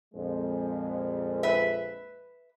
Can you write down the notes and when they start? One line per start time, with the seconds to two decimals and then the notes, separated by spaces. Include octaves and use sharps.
0.14 A#1 F2 G#3
1.43 B4 E5